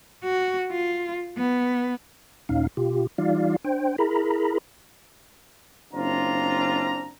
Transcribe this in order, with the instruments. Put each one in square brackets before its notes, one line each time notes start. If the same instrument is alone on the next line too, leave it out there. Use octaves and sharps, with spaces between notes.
[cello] F#4
F4
B3
[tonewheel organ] D#2 A#2 C#4 D#4 F5
B2 F4 G4
E3 G3 D#4 F4 D5 F5
D4 C5 G5
E4 G#4 A#4 A#5 B5
[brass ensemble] F#1 C4 D4 F4 A#5